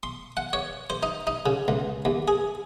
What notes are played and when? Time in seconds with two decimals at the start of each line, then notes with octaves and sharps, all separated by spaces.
0.03 C6
0.37 F#5
0.53 C#5
0.90 C5
1.03 D#4
1.27 D#4
1.46 C#3
1.68 C#2
2.05 D#2
2.28 G#4